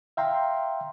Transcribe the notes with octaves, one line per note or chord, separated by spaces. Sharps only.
E5 F5 G5 A#5 C6